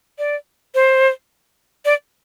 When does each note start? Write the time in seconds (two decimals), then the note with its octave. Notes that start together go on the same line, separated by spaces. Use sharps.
0.19 D5
0.75 C5
1.85 D5